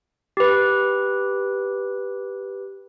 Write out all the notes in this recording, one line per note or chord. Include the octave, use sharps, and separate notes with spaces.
G4 B4